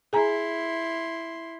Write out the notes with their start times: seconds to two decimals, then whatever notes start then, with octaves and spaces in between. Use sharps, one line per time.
0.13 E4 G#4 G#5 A#5 C6